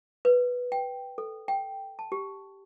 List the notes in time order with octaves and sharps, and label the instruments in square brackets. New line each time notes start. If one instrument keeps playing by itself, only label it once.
[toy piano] B4
G5
A4
G5
A5
G4